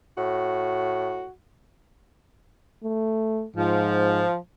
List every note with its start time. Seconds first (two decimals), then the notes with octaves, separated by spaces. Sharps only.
0.18 A2 F#4
2.83 A3
3.56 G#2 F3